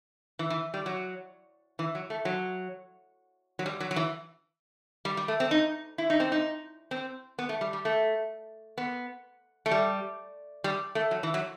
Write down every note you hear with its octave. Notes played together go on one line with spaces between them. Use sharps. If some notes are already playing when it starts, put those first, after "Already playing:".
E3
E3
G3
F#3
E3
F#3
A3
F#3
F#3
G3
F#3
F#3
E3
G3
G3
A3
C4
D#4
E4
D#4
C4
D#4
C4
B3
A3
G3
G3
A3
B3
A3
G3
G3
A3
F#3
E3
F#3